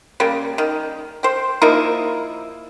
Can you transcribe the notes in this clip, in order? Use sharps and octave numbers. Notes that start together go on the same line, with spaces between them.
C#3 G3 A#3
D#3
C5 G5
F3 A#3 D#4 E4